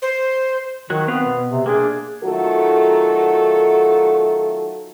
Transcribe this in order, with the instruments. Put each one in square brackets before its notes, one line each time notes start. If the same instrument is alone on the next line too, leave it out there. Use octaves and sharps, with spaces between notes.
[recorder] C5
[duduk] D#3 [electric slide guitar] F#3 F#4
[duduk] B3 [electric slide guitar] C4 B4 F5
[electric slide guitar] B2
[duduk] C3
[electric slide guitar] A#3 D4 [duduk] G#4
[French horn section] D#3 F#3 A3 F4 F#4 A4